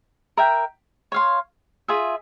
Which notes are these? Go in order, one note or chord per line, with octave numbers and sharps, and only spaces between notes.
A#4 E5 G5
C#5 F5 C6
F4 G#4 E5